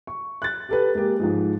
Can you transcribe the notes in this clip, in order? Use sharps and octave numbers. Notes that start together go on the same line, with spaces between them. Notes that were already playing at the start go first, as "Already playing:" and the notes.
C#6
F#6 A6
G4 A4 B4
G#3 A#3 G4
G#2 F3 G#3